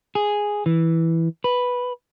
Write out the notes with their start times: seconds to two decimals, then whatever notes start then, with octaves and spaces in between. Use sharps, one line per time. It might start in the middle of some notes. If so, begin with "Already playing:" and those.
0.15 G#4
0.66 E3
1.44 B4